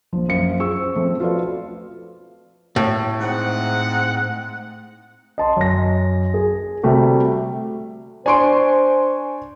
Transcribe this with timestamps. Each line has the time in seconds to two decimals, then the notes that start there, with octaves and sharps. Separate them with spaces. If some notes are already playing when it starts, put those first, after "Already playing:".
0.13 A#1 F3
0.28 F#2 C5 F5 C#7
0.59 F4 G#4 C#6 E6
0.77 C5
0.95 F3 A3 C4
1.20 F4 F#4 A4 B4 D5 F5
2.76 A2
3.21 G#2 C4 F#5
5.38 D#5 A5 C6
5.57 F#2 A#6
6.34 G#4
6.83 C3 G3 A3 F#4 A4
8.26 D4 C5 G#5 C6 C#6 D7